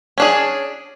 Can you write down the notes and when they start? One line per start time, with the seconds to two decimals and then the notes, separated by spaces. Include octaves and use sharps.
0.18 C#4 D4 G#4